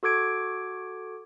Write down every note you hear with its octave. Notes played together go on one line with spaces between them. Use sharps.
F#4 A4 D6 G#6 D7